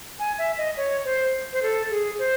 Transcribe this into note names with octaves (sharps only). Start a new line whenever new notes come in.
G#5
E5
D#5
C#5
C5
C5
A4
G#4
C5